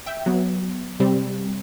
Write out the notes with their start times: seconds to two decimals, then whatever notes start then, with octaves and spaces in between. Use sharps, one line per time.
0.06 E5 G5
0.26 F#3 B3
1.00 C3 G3 C4